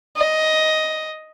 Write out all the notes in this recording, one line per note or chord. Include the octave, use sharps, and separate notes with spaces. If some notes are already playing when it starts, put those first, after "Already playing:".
D#5